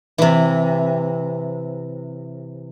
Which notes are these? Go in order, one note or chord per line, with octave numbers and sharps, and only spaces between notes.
C3 E3